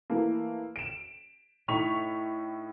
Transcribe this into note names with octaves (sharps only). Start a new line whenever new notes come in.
E3 A3 A#3
D7 E7
A2 D#4 C#6 B6 F7